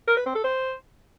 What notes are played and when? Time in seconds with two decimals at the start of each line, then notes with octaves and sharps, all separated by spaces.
0.08 A#4
0.17 B4
0.26 C4
0.35 A4
0.44 C5